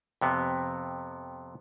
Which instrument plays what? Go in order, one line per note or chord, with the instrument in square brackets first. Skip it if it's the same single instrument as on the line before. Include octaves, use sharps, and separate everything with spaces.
[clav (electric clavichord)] F2 C3 B3